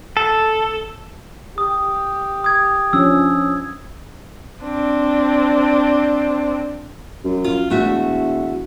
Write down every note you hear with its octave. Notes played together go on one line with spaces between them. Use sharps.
A4
G4 D#6
D#6 G#6
F3 C#4 D4 E6
C4 D4
F#2
F4
E1 A3 F#4 E5